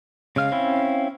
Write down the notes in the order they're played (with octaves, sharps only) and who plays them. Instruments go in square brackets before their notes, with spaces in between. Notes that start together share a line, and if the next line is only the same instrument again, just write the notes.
[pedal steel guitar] C#3 G#3 F6 [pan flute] F5
[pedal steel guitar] C4 C#4 E4